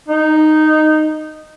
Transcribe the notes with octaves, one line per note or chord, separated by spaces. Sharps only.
D#4